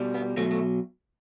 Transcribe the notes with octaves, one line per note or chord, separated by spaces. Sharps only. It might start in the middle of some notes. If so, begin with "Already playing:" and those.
Already playing: B2 G3
B3
B2 F#3 A3
A3